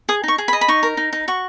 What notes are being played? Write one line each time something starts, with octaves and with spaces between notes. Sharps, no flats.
G#4 D#6
D#4 C#6
G#4
B5
D#5
B5
D#4 C#6
A#4
D#4
D#4
F#4 C#6